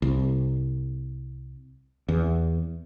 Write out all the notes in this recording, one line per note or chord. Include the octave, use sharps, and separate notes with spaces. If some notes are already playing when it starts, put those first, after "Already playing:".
C2
E2